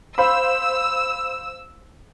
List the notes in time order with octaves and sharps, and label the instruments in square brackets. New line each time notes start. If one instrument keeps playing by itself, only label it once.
[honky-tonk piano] C5 F5 B5 [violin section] E6